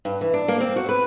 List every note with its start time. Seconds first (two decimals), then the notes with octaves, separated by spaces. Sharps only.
0.05 G2
0.21 E3
0.33 D4
0.48 A#3
0.60 C4
0.76 F#4
0.89 B4